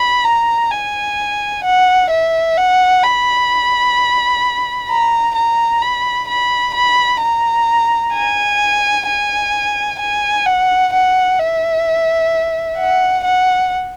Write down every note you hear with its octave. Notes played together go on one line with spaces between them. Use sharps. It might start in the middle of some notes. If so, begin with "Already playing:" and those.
Already playing: B5
A#5
G#5
F#5
E5
F#5
B5
A#5
A#5
B5
B5
B5
A#5
G#5
G#5
G#5
F#5
F#5
E5
F#5
F#5